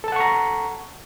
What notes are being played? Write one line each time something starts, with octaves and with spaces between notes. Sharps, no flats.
A4 F#5 A5 A#5 C#6